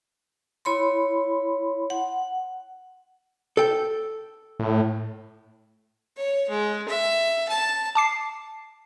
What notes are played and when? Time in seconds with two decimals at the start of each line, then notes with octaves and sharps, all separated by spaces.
0.65 E4 C#5 B5 C6
1.90 F#5
3.57 A4 G5
4.60 A2
6.17 C#5
6.49 G#3
6.88 E5
7.48 A5
7.95 A5 D6 C7